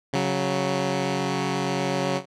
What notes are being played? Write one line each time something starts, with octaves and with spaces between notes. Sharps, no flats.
C#3 F#3